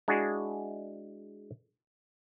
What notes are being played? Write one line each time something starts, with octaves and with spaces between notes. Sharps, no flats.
G#3 D4 E4 F#4 G#4